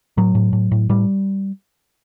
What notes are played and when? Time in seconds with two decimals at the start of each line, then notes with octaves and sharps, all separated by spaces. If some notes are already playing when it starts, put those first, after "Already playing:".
0.17 A2 F#3
0.35 A2
0.53 A2
0.72 A2
0.89 A2 G3